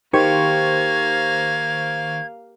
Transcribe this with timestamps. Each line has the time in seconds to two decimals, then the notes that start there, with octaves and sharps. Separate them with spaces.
0.13 D#3 A#3 G4 C5 F5 C#6 G#6